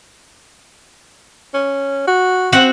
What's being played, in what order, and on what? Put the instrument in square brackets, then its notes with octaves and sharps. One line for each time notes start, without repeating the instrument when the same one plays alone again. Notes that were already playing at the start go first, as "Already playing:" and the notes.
[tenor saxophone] C#4
F#4
[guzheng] C4 F#4 F#5